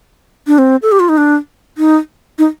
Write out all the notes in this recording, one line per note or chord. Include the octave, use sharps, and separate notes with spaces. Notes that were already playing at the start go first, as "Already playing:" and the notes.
D4
C4
A4
G4
F4
D#4
D4
D#4
D#4